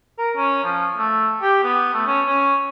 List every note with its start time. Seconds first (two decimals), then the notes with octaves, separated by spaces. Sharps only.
0.18 A#4
0.37 C#4
0.64 F3
0.98 A3
1.42 G4
1.64 B3
1.93 A3
2.07 C#4
2.27 C#4